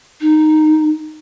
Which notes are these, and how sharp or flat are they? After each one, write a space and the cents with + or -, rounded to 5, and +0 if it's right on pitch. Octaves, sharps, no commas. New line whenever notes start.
D#4 -5